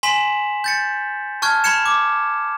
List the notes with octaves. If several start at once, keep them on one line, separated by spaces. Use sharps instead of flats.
G#5 C6 B6 E7 F#7
G6 A6 C#7
A5 C#6 F6 F#6 G#6
B5 C#6 F#6 G#6 C#7 E7
D6